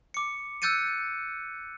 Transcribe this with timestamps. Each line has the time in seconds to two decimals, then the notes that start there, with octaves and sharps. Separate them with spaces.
0.14 D6 C#7
0.62 E6 F#6 G6 A6 C#7 D#7